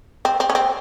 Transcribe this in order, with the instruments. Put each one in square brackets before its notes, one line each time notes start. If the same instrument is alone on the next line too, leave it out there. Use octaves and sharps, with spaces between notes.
[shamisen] C4
C4
C#4
C4